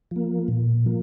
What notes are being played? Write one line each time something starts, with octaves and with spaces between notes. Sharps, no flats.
F3 A#3
A#2
F3 A#3